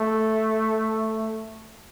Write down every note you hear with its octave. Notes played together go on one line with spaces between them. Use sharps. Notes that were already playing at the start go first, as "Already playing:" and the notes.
Already playing: A3